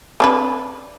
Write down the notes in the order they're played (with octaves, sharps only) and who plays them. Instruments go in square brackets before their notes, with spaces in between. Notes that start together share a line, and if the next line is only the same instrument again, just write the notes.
[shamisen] C4 D4 B4